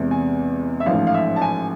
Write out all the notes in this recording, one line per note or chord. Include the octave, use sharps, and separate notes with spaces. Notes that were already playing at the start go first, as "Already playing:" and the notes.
Already playing: E2 C3 G#3
G#5
E5
A1 G#2 F3 A3 F5
F5
E5
A5
G#5